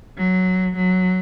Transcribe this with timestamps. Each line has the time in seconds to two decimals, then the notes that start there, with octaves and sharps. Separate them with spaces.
0.17 F#3
0.76 F#3